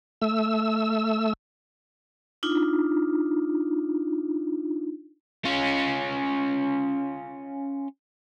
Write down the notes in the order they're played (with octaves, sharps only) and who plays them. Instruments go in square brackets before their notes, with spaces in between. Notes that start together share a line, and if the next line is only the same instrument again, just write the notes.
[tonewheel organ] A3 E6
[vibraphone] D4 D#4 F4
[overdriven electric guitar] C#4 F4